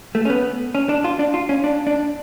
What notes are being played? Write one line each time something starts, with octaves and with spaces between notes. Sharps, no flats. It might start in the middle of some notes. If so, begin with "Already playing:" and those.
A3
C#4
B3
C#4
D4
F4
D4
F4
C#4
D4
D4